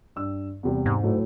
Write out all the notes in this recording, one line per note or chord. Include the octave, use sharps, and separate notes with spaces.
G2 E6
E2 C3 G3
G#2
A2 F#3 A3